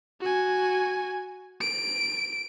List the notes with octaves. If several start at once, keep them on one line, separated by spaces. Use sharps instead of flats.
F#4 G#5
D7